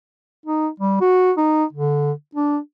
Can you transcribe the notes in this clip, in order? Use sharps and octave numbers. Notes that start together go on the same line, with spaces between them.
D#4
G3
F#4
D#4
D3
D4